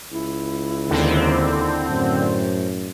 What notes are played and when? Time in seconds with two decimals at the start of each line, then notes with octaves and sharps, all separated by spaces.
0.12 C#2 E4
0.91 D#2 D3 C4
1.90 F#2 A2 C5